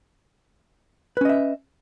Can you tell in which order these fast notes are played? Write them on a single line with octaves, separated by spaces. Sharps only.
B4 C#4 D#5 E5